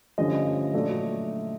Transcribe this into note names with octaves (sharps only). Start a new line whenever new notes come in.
G2 D3 F3 A3 C#4 D#5
A#2 F#3 A3 D4